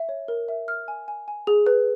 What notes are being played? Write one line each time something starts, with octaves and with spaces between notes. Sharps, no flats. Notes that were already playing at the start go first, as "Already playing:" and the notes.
Already playing: E5
C#5
A#4
E5
F6
G#5
G#5
G#5
G#4
B4